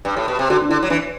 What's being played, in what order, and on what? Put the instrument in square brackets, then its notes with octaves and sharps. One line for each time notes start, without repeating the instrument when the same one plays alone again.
[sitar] G2
A2
B2
C3
[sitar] D3 [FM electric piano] F#4
[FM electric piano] D4
[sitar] D3 [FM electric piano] E4
[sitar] F#3
[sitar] E3 [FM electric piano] D4